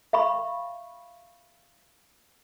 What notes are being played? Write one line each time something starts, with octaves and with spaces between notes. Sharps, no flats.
E5 F5 B5 C#6